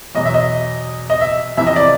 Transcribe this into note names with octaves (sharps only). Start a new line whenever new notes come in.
E2 B2 F#3 D#5
E5
D#5
D#5
E5
F2 C3 E3 E5
D#5
D5